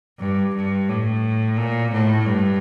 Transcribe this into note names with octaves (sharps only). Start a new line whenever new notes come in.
G2
G2
A2
A#2
A2
G2